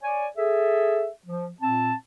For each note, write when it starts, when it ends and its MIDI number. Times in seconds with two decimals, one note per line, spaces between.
0.02 0.27 73
0.02 0.27 74
0.02 0.27 80
0.37 1.07 68
0.37 1.07 69
0.37 1.07 76
1.26 1.47 53
1.61 1.94 46
1.61 1.94 60
1.61 1.94 81